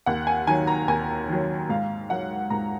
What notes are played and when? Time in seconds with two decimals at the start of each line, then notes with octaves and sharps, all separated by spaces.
0.06 D#2 F#5
0.27 G#5
0.47 D#3 F#3 G#5
0.67 A#5
0.88 D#2 G#5
1.29 D#3 F#3
1.69 G#2 F5
2.10 F#3 F#5
2.50 G#2 A#5